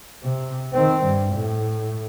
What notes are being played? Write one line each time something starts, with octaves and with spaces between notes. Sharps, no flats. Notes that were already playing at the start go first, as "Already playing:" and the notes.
C3
D#3 C4
G2
A2